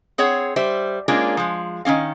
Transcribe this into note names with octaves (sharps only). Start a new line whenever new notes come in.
C4 G#4 C#5 F#5
G3 C5 E5
G#3 A#3 C#4 D4 F4 G#4
F3 G#3
D#3 C4 C#4 F5